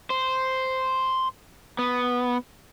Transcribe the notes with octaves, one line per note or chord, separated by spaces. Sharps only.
C5
B3